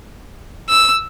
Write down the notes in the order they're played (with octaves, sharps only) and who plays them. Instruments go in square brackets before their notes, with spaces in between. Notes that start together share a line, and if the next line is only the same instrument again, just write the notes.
[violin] E6